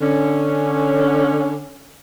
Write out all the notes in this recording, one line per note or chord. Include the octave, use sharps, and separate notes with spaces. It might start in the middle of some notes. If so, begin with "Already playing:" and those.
D3 C#4